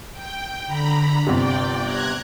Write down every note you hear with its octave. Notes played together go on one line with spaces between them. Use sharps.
G5
D3 A#5 B5
G1 C3 D5 G5
A#5 F#6 G#6